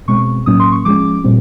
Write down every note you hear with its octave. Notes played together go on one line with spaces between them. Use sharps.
B2 G#3 C4 C#6
A2 F#3 A#3 C#4 D#6
C6
C#6
F3 G#3 C#4 D6
A#2 G3 C4